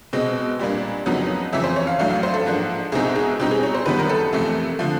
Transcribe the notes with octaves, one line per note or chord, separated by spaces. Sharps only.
B2 G#3 C4 D#5
A#2 G3 A#3 D4
F2 C#3 F#3 B3 D#4
F2 C#3 E3 E5
C5
C#5
F5
A2 F#3 A3 D4 F5
F5
C5
A4
G#2 F3 A#3 D4
C2 B2 G#3 C4 D#4 G#4
G#4
B2 G3 C4 D#4 G4
G#4
C#5
C5
F#2 D#3 G3 B3 B4
A#4
A4
F2 C3 E3 A3
D3 F3 A3